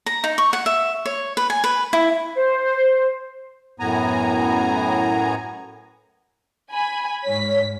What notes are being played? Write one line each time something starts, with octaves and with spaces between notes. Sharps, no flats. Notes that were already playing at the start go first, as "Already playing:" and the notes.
A#5
D#4
C#6
F#5
E5
C#5
B4
G#5
B4
E4
C5
F#2 A2 B3 G#5 A#5
G#5 B5
G#2 C#5 B6